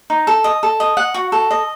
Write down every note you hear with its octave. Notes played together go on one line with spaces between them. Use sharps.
D#4
A4
D#5
A4
D#5
F#5
F#4
A4
D#5